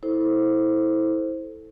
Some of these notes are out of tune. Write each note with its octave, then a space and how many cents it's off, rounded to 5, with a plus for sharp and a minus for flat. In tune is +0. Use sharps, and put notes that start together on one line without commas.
E4 -25 A4 +0 C5 +5